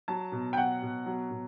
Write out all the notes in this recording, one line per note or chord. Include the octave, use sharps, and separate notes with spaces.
F#3 A5
B2
G5
F#3 F#5
B2
F#3
B2